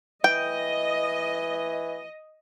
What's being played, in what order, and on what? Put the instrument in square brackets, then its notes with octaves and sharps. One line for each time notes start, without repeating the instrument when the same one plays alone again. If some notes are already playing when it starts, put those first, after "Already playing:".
[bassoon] E3 [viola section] D#5 [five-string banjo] G5